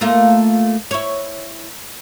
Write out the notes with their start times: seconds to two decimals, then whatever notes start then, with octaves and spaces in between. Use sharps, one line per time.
0.01 A3 A#3 F4
0.91 E4 C#5